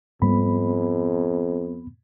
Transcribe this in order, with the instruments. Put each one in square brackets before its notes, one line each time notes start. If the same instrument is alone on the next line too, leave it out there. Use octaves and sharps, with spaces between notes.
[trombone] F2 [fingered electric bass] G#2 G3 A#3 [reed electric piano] B3 B5